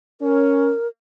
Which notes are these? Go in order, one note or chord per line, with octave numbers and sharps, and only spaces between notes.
C#4 A#4